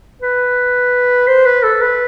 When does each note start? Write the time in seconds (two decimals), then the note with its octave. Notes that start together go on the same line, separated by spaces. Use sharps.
0.22 B4
1.27 C5
1.45 B4
1.63 A4
1.81 B4